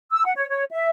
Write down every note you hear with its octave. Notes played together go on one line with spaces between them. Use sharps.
E6
F#5
C#5
C#5
E5